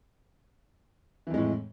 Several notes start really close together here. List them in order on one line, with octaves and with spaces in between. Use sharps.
E3 F2 G#3 A2